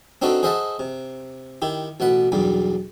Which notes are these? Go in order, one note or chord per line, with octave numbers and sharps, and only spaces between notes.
C4 D4 D#4 F#4 A4 B4
G#4 C5 D#5 E5 F#5 A5
C3
D#3 E4 G4
A1 B2 F#5 B5
B1 E2 G2 G3